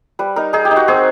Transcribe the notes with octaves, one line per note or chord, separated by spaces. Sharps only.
G3 B4
D#4 A#4
D#4 G#4
G4
D#4
F#4
C4 G#4